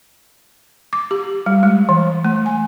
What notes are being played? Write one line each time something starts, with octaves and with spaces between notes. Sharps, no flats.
D6
G4
G3
G#3
E3
A3
G#5